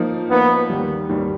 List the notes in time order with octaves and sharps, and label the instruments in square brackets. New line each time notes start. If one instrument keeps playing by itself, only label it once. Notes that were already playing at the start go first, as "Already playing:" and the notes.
Already playing: [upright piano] F3 A#3 D#4
[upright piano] F3 A#3 D#4 [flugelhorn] B3
[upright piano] D#2 D#3 G3
D#2 D#3 G3